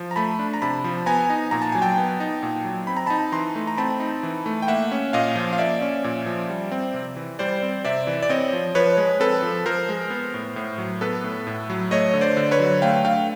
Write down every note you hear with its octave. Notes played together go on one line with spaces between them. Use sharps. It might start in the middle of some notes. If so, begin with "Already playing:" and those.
Already playing: F3
A#5
A3 A5 B5
D4
A#5
C3 A5 B5
F3
B3 G#5 A#5
D#4
A#2 A#5
A5
F#3 G#5
G5 A5
B3
D#4
A#2
F#3
C4 B5
A#5
D#4 A5 B5
E3 A#5 C6
A3
A#5
C4 A5 B5
D#4
E3
A3
G5
A#3 E5 F#5
C#4
A#2 D#5 F5
F3
F5
A#3 D5 E5
C#4
A#2
F3
G3
C4
C3
E3
G3 C5 D5
C4
C3 D5 E5
E3
D5
C4 C#5 D#5
F3
F3 B4 C#5
G#3
C4 A4 B4
F3
F3 A#4 C5
G#3
B3
A2
A2
F#3
B3 A4 B4
A2
A2
F#3
A3 C#5 D#5
D3
C5 D5
D3
B4 C#5
F#3
A3 F5 G5
D3 F5 G5